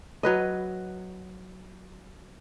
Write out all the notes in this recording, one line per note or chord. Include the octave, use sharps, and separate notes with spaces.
F#3 B4 D#5